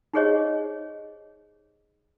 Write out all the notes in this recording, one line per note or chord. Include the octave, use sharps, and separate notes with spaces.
D#4 G4 G#4 C5 C#5 D#5